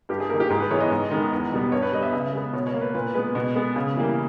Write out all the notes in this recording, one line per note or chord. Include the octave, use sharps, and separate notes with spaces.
G2 G4
G#4
D#3 A#3 A#4
G4
G#2 G#4
B4
E3 G#3 B3 C#5
D#5
G#2
D#3 G#3 B3
E2
B2 G3 B3
G2 C#5
B4
G3 B3 D#5
E5
C#3 E5
G#3 B3
B2 C#5
C#5
A#3
B4
A#2 B4
G#3 B3 B4
B2
G#3 B3
C#3
E3 G3 A#3